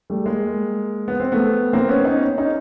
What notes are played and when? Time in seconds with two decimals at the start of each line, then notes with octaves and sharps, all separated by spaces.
0.10 G3 A3
0.26 G#3 A#3
1.08 B3
1.20 C4
1.32 A3 B3
1.73 A#3 C4
1.88 B3 C#4
2.05 C#4 D#4
2.38 C#4 D#4